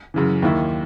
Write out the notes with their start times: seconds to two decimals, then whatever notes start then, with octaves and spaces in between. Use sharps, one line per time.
0.14 F#2 C#3 E3
0.42 D#2 D#3 A#3 E4